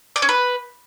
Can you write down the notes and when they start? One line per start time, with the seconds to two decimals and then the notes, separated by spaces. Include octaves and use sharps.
0.16 D5
0.22 C#4
0.29 B4